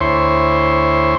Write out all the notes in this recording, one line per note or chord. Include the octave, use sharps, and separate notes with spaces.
D2 E4 C5 C#5 C6